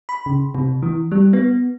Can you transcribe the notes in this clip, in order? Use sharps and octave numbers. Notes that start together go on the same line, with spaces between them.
B5
C#3
C3
E3
G3
B3